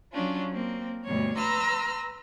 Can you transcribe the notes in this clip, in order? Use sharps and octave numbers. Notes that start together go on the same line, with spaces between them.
F#3 C#4 D4 F4
A#3 C4
D2 G2 B2 C#5
B4 A#5 C6 E6 F6